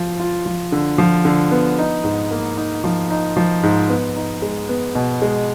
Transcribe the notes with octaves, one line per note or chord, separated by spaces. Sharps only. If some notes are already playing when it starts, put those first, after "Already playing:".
Already playing: F3 F4
F4
F3
D3
F3
D3
B3
D#4
G#2
A#3
D#4
F3
D#4
F3
G#2
B3
D#4
G#3
B3
B2
G#3